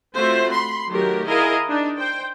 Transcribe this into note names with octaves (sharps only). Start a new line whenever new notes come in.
A3 C4 F4 F#4 C5 E5
B5 C6
D#3 F#3 A3 G4 A#4
E4 G#4 A#4 D#5 F5
D4 D#4
C5 G5